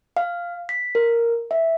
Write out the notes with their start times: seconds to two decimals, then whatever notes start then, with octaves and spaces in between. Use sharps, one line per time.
0.17 F5
0.69 B6
0.95 A#4
1.51 E5